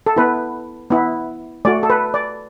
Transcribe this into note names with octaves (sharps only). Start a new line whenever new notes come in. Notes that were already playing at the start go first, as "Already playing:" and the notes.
A4
B3 E4 B4
B3 E4
A3 F#4 D5
A4
B4
D5